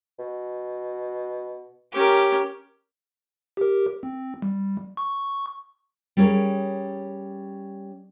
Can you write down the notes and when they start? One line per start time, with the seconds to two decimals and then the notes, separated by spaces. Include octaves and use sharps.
0.19 B2
1.94 C#4 G4 A#4
3.57 G4 A#4
4.03 C4
4.42 G3
4.97 C#6
6.17 G3 C#4 G#4 A#4 C#5